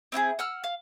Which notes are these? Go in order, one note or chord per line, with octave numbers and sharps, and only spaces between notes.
C4 E4 G4 G#4
F#5 E6 F6
F5